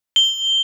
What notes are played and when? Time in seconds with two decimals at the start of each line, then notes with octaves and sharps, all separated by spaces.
0.16 G7